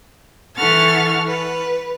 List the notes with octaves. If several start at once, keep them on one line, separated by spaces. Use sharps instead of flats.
E3 A4 F#5 C#6 F6 A6
B4